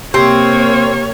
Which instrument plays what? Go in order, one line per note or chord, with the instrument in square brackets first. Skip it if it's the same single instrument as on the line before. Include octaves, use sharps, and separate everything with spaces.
[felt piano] C3 [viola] A#3 C#5 [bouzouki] C4